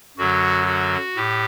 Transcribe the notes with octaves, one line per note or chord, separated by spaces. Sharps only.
F#2 D3 F#3 F#4
F#4
A2 G4